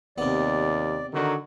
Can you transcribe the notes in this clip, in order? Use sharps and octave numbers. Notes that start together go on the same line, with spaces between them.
D#2 C3 B3 D5
D3 D#3 F#3